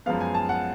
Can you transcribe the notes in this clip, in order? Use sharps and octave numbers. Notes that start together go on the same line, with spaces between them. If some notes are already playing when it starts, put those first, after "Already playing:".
F#2 F3 G#3 B3 F5
G#5
A5
F#5